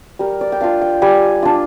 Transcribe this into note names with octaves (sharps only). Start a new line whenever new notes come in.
G3 A#4
D5
G5
D4 F4 F5
G5
G3 G#5
D4 F4